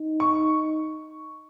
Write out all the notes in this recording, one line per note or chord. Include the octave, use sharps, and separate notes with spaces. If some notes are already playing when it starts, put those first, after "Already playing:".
Already playing: D#4
C#6